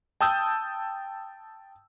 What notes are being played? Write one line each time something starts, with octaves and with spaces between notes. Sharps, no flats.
G5 A5 D#6 E6 G6